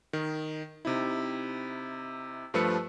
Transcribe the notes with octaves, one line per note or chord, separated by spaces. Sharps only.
D#3
C3 D#4 E4
G2 F3 A3 B4 E6 C#7